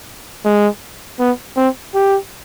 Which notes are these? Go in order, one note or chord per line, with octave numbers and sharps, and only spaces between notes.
G#3
B3
C4
G4